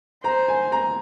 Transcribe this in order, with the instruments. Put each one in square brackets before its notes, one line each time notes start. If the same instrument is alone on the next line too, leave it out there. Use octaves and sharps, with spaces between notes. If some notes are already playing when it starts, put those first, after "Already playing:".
[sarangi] C5 [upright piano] A#5
[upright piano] G#5
A#5